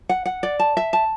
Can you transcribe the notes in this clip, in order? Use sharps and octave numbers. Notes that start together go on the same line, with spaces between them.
F#5
F#5
D5
A5
E5
A5